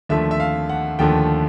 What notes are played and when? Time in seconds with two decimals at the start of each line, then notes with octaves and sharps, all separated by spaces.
0.09 D#2 D3 F3 A3 E5
0.31 E5
0.40 F5
0.69 F#5
0.99 D#2 D3 F3 A3 G5